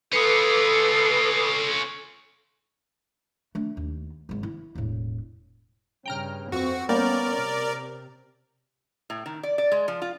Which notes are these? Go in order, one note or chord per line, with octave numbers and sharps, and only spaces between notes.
C#4 F4 A4 B4 D6 D#6 C7
A3 D4
D#2
G#1 G#2
E4
E1 A2
G2 C#3 G5 A#5 F6
F2 C4 F#4 C#6
G3 A#3 B3 C#4 A#4 D5
C3
A2
D#3
D5
D5
G#3
F3
F4